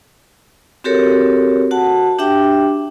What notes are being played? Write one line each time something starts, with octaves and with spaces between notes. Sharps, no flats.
C4 F#4 G4 A4 A#4 C#5
F#4 F#5 A5
D4 G4 E5 G5 D6